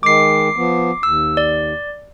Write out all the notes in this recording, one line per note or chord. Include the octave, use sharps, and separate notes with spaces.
D#3 G#3 D6 C7
F3 B3
D#2 E6
D5